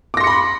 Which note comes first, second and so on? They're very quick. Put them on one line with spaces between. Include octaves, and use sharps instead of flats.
D6 A#6 C6 C#7 B5